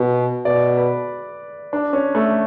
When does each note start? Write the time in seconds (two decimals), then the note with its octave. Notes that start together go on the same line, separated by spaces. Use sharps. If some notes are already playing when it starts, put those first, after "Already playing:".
Already playing: B2
0.45 B2 D5
0.77 B4
1.73 D4
1.93 C#4
2.15 A3